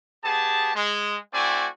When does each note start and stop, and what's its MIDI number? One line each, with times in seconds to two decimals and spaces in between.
0.23 0.74 59
0.23 0.74 67
0.23 0.74 68
0.23 0.74 81
0.75 1.18 56
1.33 1.67 57
1.33 1.67 60
1.33 1.67 64
1.33 1.67 66
1.33 1.67 74
1.33 1.67 80